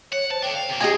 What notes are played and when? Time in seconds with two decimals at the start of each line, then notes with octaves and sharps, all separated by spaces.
0.12 C#5 F#5
0.31 C5 A5
0.43 A3 D4 G5
0.55 F5
0.69 C3 A#3
0.80 D4 F4 G#4 D#5 G#5